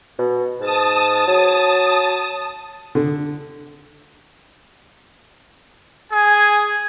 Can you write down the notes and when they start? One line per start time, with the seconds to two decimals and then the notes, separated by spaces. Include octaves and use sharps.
0.19 B2
0.60 G#2 A5 D#6
1.27 F#3
2.95 D3
6.12 G#4 G#5